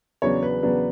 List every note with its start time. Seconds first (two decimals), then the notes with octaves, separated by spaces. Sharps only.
0.22 E2 C#3 F#3 B3 D4 C#5
0.43 B4
0.63 E2 C#3 F#3 B3 D4